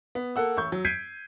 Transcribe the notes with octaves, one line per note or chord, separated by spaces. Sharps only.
B3
A#3 A4 F#5 E6
A1 C#6 G6
F#3
G6 G#6 B6 C7 D7 D#7